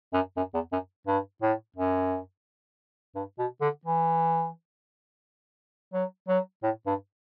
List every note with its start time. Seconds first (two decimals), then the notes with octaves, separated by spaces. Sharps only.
0.13 F#2
0.37 F#2
0.54 E2
0.72 F#2
1.07 G2
1.42 A2
1.76 F#2
3.15 G2
3.39 B2
3.61 D3
3.85 E3
5.93 F#3
6.28 F#3
6.63 A2
6.87 G2